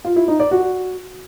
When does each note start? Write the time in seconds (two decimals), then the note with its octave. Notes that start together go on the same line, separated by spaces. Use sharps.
0.05 F4
0.16 E4
0.28 D#4
0.40 D5
0.51 F#4